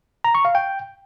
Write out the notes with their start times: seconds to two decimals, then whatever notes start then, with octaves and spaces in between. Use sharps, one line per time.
0.24 A#5
0.35 C#6
0.45 F5
0.55 G5